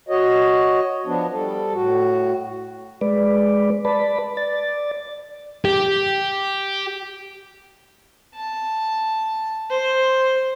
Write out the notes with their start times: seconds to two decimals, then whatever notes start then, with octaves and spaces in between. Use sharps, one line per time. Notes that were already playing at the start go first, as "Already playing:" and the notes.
0.09 F#4 C#5 D#5
1.06 F3 B3 D4
1.32 G3 A4
1.73 A2 F#4
3.01 G#3 B4 D5
3.85 B4 D5 A5 B5
4.37 D5 A6
5.65 G4
8.35 A5
9.70 C5